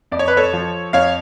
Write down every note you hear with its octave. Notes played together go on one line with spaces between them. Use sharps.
F2 D5
C#5
B4
A4 C#5
F3
F2 C#5 F5